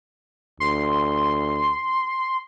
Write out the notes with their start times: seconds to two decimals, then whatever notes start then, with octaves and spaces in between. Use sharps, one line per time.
0.60 D2 C6